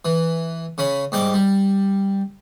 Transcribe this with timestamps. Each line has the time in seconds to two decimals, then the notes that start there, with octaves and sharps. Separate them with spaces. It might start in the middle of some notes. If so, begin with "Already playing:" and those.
0.05 E3
0.78 C#3 C#4 B5
1.12 G#2 G3 G5 D6
1.34 G3